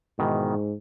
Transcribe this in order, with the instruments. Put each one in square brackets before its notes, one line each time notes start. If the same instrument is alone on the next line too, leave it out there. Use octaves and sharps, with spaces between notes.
[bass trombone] G#2 [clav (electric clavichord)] B2 D#3 E3